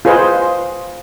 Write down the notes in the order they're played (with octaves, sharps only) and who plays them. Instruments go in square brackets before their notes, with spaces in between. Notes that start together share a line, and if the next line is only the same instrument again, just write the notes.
[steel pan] F4 G#4 B4 C5 D#5